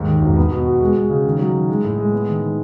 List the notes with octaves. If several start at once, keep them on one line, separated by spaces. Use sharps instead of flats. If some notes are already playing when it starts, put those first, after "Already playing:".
Already playing: D#2 G#2
D#3
E1
B3
B2
F#4
G#3
G#3
C#3
D#3
F#3
D#3
G#3
A2
G#3
B3
D#3
D#3